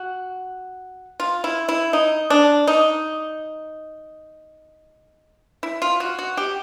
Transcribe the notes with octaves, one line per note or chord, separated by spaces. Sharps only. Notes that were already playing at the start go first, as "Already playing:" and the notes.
Already playing: F#4
F4
E4
E4
D#4
D4
D#4
E4
F4
F#4
F#4
G4